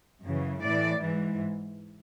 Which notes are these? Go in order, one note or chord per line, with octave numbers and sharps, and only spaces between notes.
F#2 C#3 E3
A2 E3 D5
G#2 E3